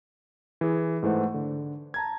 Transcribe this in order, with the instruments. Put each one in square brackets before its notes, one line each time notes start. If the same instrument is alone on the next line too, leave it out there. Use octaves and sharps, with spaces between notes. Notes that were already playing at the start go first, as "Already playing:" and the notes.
[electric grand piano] E3 G#4
G#2 E3 A3 C5 F#5
D3
A5 A#5 G#6